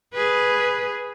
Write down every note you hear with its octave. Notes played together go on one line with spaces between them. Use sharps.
G#4 B4